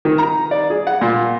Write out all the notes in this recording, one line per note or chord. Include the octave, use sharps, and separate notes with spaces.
D#3
A#5
D5
G#4
F#5
A#2